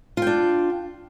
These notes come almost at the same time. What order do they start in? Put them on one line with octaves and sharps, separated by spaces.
F4 G5 D4